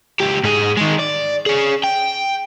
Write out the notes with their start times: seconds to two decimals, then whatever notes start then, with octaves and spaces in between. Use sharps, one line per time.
0.20 C#2 G4
0.43 G#2 G#4
0.77 D#3 G#3
1.00 D5
1.46 C#4 G#4
1.84 G5